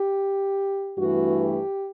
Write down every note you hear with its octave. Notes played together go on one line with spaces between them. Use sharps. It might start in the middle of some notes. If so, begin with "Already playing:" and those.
Already playing: G4
G2 E3 A3 F#4
G4